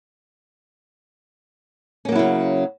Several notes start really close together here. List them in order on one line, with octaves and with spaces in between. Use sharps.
C#4 A#3 F#3 E4 C#3